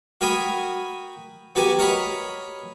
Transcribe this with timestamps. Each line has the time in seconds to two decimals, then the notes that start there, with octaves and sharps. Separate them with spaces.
0.21 F#4 A#4 G5 G#5 B5 D#6
1.55 B3 F#4 G4 A#4 G#5
1.79 A#4 C#5 D#5 A#5 B5